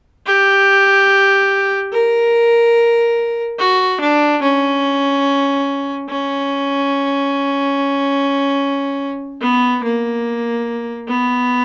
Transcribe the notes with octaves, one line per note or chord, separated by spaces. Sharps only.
G4
A#4
F#4
D4
C#4
C#4
B3
A#3
B3